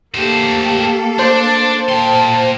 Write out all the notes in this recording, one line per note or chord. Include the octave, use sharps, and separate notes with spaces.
A3 A#3 G4 A4 C5
D4 C5
A#2 G5 A5 C6